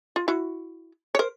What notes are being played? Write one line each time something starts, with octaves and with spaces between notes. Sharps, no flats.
F4
E4 F#4
C#5
A#4 C5